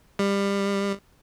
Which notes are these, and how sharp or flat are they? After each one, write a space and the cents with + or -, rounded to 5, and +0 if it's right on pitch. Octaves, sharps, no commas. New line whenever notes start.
G3 +25